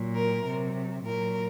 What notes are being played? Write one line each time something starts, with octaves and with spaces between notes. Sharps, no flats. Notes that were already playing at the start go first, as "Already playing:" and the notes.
Already playing: A#2 F#3
A#4
C3 F#3
A#2 F#3 A#4